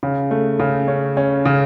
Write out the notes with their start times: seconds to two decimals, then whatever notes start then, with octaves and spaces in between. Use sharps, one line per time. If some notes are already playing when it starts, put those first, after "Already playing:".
0.03 C#3
0.31 A3
0.60 C#3
0.88 C#4
1.17 C#4
1.45 C#3